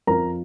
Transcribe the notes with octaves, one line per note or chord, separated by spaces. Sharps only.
F2 F3 A#4 A#5